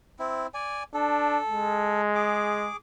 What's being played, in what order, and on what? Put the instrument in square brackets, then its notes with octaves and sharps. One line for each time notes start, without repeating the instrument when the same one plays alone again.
[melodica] C4 E4
D5 G#5
[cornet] D4 [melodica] A4
[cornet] G#3
[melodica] G#4 D6